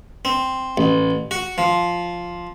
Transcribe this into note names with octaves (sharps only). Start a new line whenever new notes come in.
C4
A1
F#4
F3